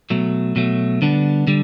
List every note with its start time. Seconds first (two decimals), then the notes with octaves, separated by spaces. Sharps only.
0.10 B2 F#3 A3
0.56 B2 F#3 A3
1.02 D3 G3 B3 D4
1.47 D3 G3